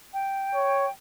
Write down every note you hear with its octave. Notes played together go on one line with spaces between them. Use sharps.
G5
C#5